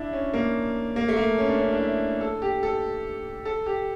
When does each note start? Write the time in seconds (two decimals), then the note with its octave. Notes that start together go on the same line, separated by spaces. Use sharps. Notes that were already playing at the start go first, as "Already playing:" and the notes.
Already playing: D4 E4
0.13 C#4
0.33 A#3
0.96 A#3
1.08 A3
1.17 A#3
1.38 C#4
1.49 D4
1.59 C#4
1.72 D4
1.79 E4
2.21 A4
2.42 G4
2.63 A4
3.45 A4
3.66 G4